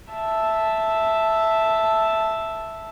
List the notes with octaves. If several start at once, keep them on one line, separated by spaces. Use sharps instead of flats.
E5 A5